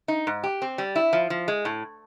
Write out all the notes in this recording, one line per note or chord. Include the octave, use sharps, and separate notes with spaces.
D#4
G#2
G4
C4
G3
E4
F3
F3
G#3
A2